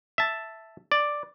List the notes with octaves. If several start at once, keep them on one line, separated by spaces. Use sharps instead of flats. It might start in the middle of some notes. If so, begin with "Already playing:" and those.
E5 A5
D5